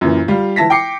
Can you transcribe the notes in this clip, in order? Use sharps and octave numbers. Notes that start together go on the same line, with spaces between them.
F#2 A#2 E3
G3 F4
E3 E4 A5 A#6 B6
G5 D6 C7 C#7